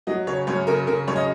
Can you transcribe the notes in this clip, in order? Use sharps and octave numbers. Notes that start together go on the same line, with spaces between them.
F#3 D#5
C#3 C#5
F#2 C#5
C#3 A#4
C#3 A#4
F#2 C#5
D#5